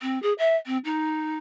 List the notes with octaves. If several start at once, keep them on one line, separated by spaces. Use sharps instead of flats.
C4
G#4
E5
C4
D#4